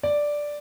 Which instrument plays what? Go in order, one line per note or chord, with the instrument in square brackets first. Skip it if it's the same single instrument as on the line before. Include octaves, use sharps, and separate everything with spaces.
[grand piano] D5